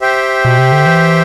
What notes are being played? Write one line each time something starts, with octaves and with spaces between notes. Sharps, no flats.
G4 C5 E5 G5
B2
C3
D3
E3